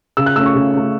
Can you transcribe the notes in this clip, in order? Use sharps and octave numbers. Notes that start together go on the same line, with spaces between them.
C#3 E6
F#6
A3 C#4 E6
C#6
C#3
A3 C#4